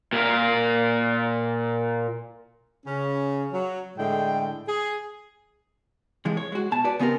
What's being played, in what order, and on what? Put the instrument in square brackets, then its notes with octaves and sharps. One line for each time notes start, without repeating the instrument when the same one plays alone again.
[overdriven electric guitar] A#2 A#4
[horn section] C#3 C#4
F#3
A2 D3 G#3 G5
G#4
[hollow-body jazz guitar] C3 E3 F3 G#3
C#5
G#3 F#4
B2 A5
F#4 B4 D5
C#3 B3 C4 G4 A#4